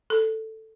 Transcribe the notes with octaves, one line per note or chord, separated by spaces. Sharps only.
A4